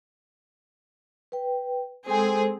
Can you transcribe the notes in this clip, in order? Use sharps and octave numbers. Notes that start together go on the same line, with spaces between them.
B4 G5
G#3 C4 G#4 A4 C5